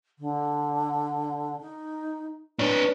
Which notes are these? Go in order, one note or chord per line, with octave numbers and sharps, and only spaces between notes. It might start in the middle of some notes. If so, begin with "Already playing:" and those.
D3
D#4
D4 B4 C#5